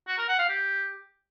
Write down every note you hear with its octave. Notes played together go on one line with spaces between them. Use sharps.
F#4
A#4
F#5
F5
G4